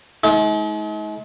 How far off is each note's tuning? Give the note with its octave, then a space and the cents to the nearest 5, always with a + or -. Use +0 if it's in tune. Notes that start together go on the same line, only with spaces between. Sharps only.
G#3 +45 D#4 +45